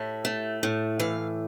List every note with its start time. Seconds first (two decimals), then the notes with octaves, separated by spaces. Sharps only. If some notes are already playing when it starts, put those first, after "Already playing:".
Already playing: A2 E5
0.25 A3
0.63 A2
1.00 E3 F5